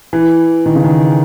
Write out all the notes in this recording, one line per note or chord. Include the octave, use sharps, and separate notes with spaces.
E3
D#3
C#3
D#3